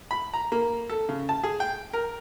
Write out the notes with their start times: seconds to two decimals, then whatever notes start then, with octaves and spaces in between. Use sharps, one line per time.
0.11 B5
0.34 A#5
0.52 A#3
0.90 A4
1.09 C#3
1.29 A5
1.43 G#4
1.60 G5
1.93 A#4